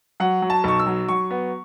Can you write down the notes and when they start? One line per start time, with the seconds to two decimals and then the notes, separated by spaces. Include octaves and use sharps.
0.20 F#3 F#5
0.42 F#3
0.50 A5
0.64 B1 C#6
0.79 E6
0.87 F#3
1.09 F#3 C#6
1.31 B3